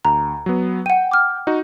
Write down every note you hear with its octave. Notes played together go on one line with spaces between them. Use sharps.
D2 A#5
F#3 B3
F#5 G5 D#7
D6 F6
D#4 F#4